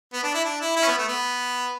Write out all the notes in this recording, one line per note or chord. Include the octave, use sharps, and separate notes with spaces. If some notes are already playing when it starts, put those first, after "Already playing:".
B3
D4
E4
D4
E4
E4
C#4
B3
A3
B3